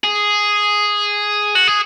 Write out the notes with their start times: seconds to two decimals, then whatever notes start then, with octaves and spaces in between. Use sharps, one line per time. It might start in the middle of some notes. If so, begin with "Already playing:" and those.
0.04 G#4
1.55 F#4
1.67 G#4